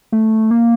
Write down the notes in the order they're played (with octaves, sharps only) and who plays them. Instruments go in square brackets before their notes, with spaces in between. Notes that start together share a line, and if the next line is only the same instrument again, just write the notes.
[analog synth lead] A3
A#3